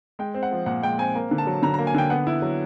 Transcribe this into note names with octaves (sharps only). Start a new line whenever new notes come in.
G#3 G5
C4
F#5
F3
A#2 F#5
G#3 G5
C4 G#5
A#3
D3
A5
F#3
D3 A#5
A#5
A#3
G#5
D3 G5
B3 F#5
E4
F#3